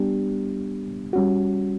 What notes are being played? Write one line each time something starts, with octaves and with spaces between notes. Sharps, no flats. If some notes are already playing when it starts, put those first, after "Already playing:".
Already playing: G3 B3 D4 G4
G3 C#4 F#4